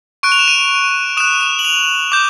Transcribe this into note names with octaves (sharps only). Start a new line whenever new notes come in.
C#6 F#6 D7
F7
E7
D#7
D#6 F#6 E7
E7
F#7
F7
D6 G6